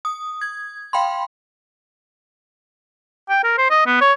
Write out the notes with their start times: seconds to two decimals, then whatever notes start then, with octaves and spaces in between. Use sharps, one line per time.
0.05 D#6
0.41 G#6
0.93 F5 G5 B5 C6
3.30 G5
3.44 A#4
3.58 C5
3.71 D#5
3.86 B3
4.01 C#5